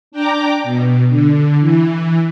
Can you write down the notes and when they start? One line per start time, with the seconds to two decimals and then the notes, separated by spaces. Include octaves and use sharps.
0.12 D4 G5 A#5 D6
0.64 B2
1.09 D3
1.60 E3